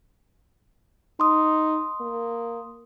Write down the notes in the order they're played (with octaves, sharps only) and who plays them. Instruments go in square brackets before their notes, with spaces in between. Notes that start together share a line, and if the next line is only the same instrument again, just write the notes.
[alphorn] D#4 [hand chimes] C6 D#6
[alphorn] A#3